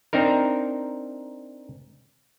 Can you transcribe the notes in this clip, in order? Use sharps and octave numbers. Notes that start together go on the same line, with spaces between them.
C4 D4 D#4 A#4